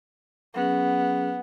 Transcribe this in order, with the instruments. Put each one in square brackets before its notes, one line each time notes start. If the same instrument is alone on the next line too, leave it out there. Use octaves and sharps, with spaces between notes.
[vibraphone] F#3 C#4 G#4 [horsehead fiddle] B3